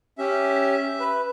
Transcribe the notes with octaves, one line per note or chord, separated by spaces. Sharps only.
C#4 G4 E5
B4